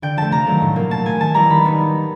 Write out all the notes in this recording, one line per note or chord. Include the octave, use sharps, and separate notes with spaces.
D3 G5
F3 A3 A5
C3 A#5
D#3 F#3 A3
A2
F#3 A#3
A#2 A5
F3 A3 G#5
D#3 A5
G3 B3 E4 A#5
D#3 B5
G3 B3 D#4